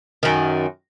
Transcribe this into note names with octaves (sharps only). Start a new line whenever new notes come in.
F#2 D#3